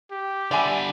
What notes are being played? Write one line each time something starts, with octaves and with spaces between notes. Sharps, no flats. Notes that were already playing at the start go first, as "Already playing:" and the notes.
G4
D3 G3 D5 E5 G#5